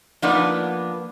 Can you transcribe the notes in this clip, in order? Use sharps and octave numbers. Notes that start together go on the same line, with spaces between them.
F3 A#3 B3 D4 D#4 D5